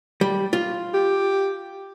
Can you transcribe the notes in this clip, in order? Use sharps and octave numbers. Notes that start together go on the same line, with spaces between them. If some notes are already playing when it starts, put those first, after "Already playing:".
G3
F4
G4